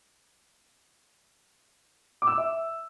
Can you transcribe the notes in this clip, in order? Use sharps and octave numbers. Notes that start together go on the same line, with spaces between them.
D6
E6
D6
E5